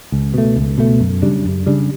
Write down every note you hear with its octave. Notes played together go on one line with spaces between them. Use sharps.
C#2
B2 A3
C#2
B2 A3
F#2
C#3 G3 D4
F#2
C#3 G3 D4